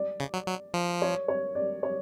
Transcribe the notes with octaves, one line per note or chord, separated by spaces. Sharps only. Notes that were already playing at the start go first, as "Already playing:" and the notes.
Already playing: D5
C#3
F#3
F#3
F3
C#5
C#5
D5
C#5